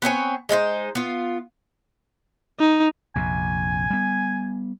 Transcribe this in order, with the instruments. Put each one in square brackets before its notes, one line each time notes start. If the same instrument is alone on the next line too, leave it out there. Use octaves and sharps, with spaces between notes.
[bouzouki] B3 C4 C#5 G#5
G#3 D#4 E4 C5
B3 F4
[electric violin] D#4
[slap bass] A#1 F2 C3 [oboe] G#5
[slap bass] G3 B3